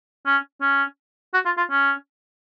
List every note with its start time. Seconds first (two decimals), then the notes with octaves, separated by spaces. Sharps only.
0.26 C#4
0.61 C#4
1.34 F#4
1.45 F4
1.58 F4
1.71 C#4